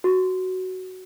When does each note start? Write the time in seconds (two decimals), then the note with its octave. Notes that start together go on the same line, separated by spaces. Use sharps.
0.04 F#4